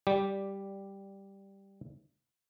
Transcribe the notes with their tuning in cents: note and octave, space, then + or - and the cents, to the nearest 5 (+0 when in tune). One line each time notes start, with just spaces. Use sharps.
G3 +0 G4 +0 D5 -5